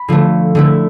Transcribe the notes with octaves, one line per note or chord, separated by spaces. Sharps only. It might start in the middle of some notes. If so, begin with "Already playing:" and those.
Already playing: B5
D3 F3 A3
D3 A3 E4